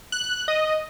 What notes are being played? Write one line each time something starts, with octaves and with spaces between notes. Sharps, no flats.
F#6
D#5